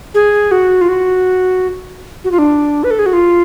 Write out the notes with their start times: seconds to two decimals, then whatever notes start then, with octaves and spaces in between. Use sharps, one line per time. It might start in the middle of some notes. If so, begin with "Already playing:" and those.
0.14 G#4
0.51 F#4
0.81 F4
0.89 F#4
2.24 F#4
2.32 F4
2.39 D4
2.84 B4
2.91 A4
2.99 G#4
3.06 F#4
3.13 F4